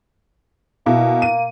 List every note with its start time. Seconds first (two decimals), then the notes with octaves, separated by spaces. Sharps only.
0.86 B2 A#3 E4
1.22 D#7